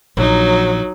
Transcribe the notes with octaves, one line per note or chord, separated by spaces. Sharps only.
A#1 F#3 D#4